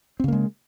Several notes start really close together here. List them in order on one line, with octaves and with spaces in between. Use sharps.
C4 C#3 A#3 G#3